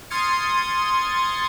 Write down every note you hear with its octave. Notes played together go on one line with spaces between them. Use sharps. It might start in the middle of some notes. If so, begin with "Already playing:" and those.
C6 D#6 F6 G#6 A6 C#7